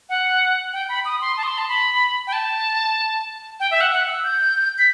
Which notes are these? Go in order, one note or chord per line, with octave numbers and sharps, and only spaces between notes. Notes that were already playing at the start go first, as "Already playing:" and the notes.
F#5
G5
B5
D#6
C6
A5
D#6
C6
A5
B5
G5
A5
G5
E5
F#5
F#5
E6
G6
B6